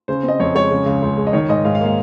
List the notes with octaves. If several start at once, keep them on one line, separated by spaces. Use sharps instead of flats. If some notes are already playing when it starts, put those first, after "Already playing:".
C#3 C5
C4
D#5
F2 C#5
G#3 C#5
C#3
C#2
C#2
G#3
D#5
D#3 C#5
G#2 D#5
G#2 F5
F5
A#3
F5